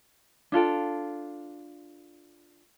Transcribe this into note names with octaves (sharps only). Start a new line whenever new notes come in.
D4 F4 A4 G5